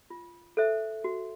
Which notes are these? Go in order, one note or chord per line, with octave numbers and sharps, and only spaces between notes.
F4
A4 C5 E5
F#4